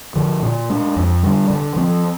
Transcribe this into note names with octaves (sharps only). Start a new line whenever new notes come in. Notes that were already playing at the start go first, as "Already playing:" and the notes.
D3 F3
A#2
G#3 D4
F2
D3 G3
D3
F3 C4